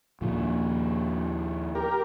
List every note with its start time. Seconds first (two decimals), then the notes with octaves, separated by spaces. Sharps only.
0.21 D#2 A#2 F3
1.75 G4 A#4